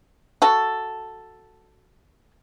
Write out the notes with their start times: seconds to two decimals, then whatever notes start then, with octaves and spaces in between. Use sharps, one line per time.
0.42 F#4 A4